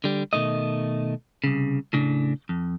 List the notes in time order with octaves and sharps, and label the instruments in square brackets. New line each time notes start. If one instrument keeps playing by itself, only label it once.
[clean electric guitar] D3 G3
B2 D#3 A3 D#5
C2 C#3
A2 C#3 D4
F2